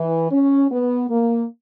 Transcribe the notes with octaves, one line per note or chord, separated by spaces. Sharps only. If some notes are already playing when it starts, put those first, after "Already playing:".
Already playing: E3
C#4
B3
A#3